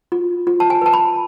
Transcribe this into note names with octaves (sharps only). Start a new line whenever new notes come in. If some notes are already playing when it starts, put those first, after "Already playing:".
F4
F4
A5
G#5
B4 A5
B5